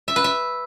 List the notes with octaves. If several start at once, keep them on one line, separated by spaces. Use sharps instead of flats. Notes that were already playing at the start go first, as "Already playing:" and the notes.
E5
B4
E5